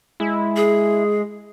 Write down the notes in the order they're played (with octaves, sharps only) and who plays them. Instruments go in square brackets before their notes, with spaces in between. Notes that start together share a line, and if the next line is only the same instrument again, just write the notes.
[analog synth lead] G#3 [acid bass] E4
[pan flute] G#4